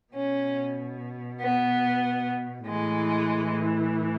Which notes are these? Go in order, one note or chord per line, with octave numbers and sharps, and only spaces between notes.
B2 C#4
B3
A2 E3 G#3